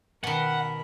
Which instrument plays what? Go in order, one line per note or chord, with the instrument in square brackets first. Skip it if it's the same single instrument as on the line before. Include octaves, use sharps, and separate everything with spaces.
[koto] B2 D#3 [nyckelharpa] A#4 B5 [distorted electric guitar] F#5